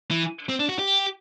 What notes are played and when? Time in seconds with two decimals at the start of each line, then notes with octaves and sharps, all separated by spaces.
0.11 E3
0.49 C4
0.59 D4
0.69 F#4
0.79 G4